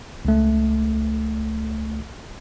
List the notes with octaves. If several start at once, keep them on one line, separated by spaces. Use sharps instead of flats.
C#2 A3